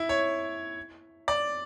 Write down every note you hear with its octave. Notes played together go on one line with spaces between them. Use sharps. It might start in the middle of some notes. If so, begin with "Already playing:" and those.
Already playing: E4
C#5
D5